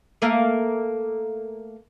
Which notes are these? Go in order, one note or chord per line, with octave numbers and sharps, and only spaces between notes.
A3 A#3 F5